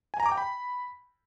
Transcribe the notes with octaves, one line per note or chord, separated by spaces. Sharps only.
G#5
A#5
D6
G5
B5